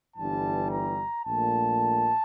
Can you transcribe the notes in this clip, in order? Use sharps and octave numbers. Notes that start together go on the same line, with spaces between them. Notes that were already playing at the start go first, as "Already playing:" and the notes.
G1 G2 E3 G3 A5
A#5
A#1 A#2 A3 A5